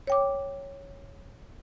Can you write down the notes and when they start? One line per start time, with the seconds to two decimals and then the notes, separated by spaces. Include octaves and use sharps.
0.07 C#5 G5 D6